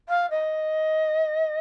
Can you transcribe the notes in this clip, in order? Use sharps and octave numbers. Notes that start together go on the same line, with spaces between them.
F5
D#5